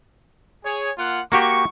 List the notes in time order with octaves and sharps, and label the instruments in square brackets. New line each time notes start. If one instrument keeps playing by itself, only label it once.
[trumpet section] G#4 C#5
A#3 F4 F#5
[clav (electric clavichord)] A#3 F#4 G4 [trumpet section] C#6